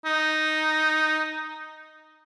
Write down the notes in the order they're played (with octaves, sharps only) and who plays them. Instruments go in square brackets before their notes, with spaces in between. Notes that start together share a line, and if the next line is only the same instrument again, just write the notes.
[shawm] D#4